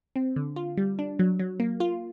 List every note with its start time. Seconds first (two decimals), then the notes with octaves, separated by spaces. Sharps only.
0.16 C4
0.36 D3
0.56 F4
0.77 G3
0.99 D4
1.19 F#3
1.39 F#3
1.60 A#3
1.80 F4